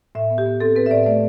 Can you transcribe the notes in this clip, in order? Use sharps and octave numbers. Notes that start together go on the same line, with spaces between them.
A2 E5
B3
G4
B3
C4 A4
C4 B4
E5
A2 D5
A3 D5